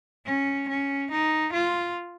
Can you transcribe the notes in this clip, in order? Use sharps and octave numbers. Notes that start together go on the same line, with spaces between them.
C#4
C#4
D#4
F4